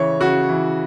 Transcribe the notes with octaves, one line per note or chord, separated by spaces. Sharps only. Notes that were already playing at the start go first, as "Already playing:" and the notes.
Already playing: C#3 E3 C#5
C#3 F#4
E3